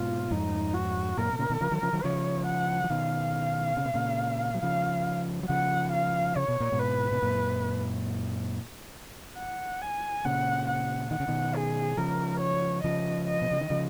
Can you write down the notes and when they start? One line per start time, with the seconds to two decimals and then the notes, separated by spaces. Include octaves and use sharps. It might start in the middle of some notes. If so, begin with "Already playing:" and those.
Already playing: G#2 B2 F4
0.31 F2 G#2 D#4
0.74 F#4
1.17 F#2 A#2 A#4
1.33 B2
1.39 A#2 C#3
1.50 B2 D#3
1.61 C#3 F3
1.71 D#3 F#3
1.82 C#3 F3
1.93 D#3 F#3
2.04 C#3 F3 C#5
2.47 F#5
2.84 F3
2.90 B2 D#3 F5
3.77 C#3
3.85 B2
3.94 A#2 C#3
4.55 F#3
4.63 C#3 F3 F5
5.43 F#3
5.49 C#3 F3 F#5
5.92 F5
6.36 C#3 C#5
6.48 B2
6.60 A#2
6.72 G#2 B2
6.79 B4
7.12 B2
7.22 F#2 A#2
9.38 F#5
9.82 G#5
10.25 A#2 C#3 F#5
10.68 F#5
11.11 D#3 F#5
11.20 C#3
11.28 B2 D#3
11.55 G#4
11.97 C#3 F3 A#4
12.40 C#5
12.83 C#3 F3 D#5
13.28 D#5
13.42 B2
13.51 C#3
13.61 D#3
13.70 C#3 F3